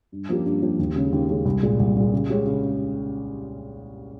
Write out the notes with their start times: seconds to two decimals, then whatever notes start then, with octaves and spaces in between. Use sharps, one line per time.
0.12 G2
0.29 F3 A#3 C#4 G4
0.45 G2
0.62 F3 A#3 C#4 G4
0.79 D#2
0.96 C#3 G#3 C#4
1.12 D#2
1.29 C#3 G#3 C#4
1.45 C2
1.63 A#2 G#3
1.79 C2
1.96 A#2 G#3
2.12 C#3
2.30 G#3 C#4 G4
2.46 C#3